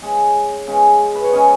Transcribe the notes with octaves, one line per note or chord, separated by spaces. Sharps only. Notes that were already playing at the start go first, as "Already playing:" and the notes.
C#3 G#3 C#4 F#5
C#3 G#3 C#4
B4
C#5
C#3 G#3 C#4 D#5